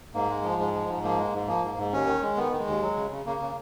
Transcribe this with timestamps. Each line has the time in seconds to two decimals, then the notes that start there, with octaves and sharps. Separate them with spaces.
0.14 G#2 A#3
0.29 G#3
0.44 F3
0.59 G#2 G#3
0.74 F3
0.89 G#2
1.03 F3 A#3
1.18 G#3
1.33 G#2
1.48 F3 A#3
1.63 G#2
1.78 G#2
1.92 D#2 C#4
2.07 D#3
2.22 G#3
2.37 D#3 B3
2.52 D#3
2.59 G#3
2.67 D#2
2.82 F#3
2.96 C#3
3.11 C#3
3.26 C#3 A#3
3.40 C#3